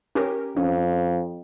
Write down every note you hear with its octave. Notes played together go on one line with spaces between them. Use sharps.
C#4 G4 A#4
F2 C#4